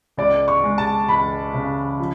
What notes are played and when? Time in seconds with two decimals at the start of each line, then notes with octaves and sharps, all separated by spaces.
0.17 C#2 D5
0.48 C#6
0.64 G#3
0.78 A5
1.09 C#2 B5
1.54 C#3
1.99 F3